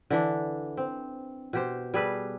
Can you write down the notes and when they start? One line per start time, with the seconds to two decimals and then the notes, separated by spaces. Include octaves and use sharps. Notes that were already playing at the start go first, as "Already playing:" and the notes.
0.10 D3 E3 D4
0.77 C4
1.53 B2 G4 C5
1.94 G3 G#4 A4 B4